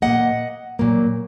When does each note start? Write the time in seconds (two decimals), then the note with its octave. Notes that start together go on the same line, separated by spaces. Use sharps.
0.02 F#3 A#3 D#5 F#5
0.07 A#2
0.79 A#2 F#3 A#3